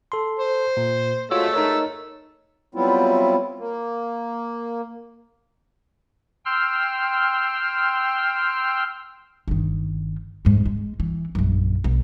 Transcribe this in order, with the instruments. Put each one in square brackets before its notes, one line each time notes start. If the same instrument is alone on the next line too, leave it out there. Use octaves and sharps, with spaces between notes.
[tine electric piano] A4 C6
[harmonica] C5
[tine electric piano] A#2
[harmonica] G#3 A3 E6 [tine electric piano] F4 F#4 C#5
[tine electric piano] D#4 A#4 C#5
[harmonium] F#3 G3 B3 C4 E4 F4
A#3
[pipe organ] G5 C6 E6 F6
[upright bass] G1 D#3
F2 G#2
G#3
E3
A#1 F#2
B1